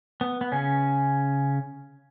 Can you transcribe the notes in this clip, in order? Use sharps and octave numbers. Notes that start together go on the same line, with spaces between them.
B3
B3
C#3 C#4